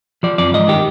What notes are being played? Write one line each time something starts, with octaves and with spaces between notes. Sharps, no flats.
F3 D5
F2 D5
G#2 D#5
D#3 G4